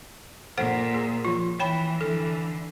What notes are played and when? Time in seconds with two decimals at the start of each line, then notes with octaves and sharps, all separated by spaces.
0.58 A#2 A4 C5 F#5
0.94 G#4
1.25 F3 F4
1.60 E3 C#5 G5 B5
2.01 D3 E3 A4